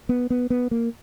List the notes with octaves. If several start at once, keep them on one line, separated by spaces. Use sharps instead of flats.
B3
B3
B3
A#3